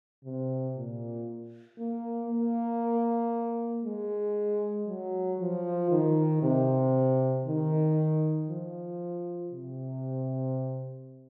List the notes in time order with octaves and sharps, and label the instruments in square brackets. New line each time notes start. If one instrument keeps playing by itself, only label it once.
[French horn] C3
A#2
A#3
A#3
G#3
F#3
F3
D#3
C3
D#3
F3
C3